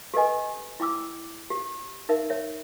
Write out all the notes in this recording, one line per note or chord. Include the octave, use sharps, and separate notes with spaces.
G4 A4 B4 D#5 G#5
E4 G5 D6 E6
G4
D#4 A#4 E5
C#5 E5